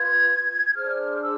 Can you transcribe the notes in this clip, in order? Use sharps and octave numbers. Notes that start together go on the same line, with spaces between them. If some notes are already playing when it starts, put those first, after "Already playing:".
Already playing: F4 B4 G#6
G#6
D4 G#4 C5 F6
E6